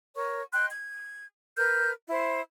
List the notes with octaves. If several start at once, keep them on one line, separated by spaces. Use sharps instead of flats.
A#4 C#5 C#6
D#5 G5 C6 F#6
G#6
A#4 B4 F6 G6
E4 C5